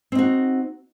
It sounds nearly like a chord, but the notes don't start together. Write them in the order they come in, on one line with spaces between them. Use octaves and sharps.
C4 D#4 F#4